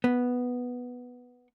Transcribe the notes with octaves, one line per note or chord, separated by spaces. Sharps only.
B3